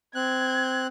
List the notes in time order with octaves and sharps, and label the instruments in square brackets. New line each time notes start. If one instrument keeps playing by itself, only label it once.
[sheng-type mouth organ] C4 F#6 [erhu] G#6